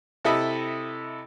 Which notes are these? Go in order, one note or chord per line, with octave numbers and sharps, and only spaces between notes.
C3 E4 A4 D#5 E5 B5